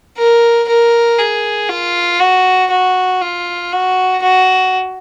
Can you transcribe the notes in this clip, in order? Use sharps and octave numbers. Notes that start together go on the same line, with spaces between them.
A#4
A#4
G#4
F4
F#4
F#4
F4
F#4
F#4